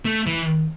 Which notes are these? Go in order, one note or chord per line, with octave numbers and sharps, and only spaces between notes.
A3
E3